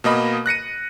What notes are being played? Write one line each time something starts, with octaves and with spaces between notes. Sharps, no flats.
B2 A#3 D#5 B5
F#6 A#6 C#7 D#7